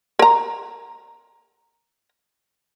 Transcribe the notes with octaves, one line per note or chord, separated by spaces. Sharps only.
A#4 A#5